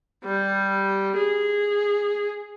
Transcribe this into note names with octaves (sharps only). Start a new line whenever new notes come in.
G3
G#4